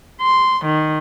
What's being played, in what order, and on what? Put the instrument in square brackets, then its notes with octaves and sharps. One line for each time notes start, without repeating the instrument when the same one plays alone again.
[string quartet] C6
D#3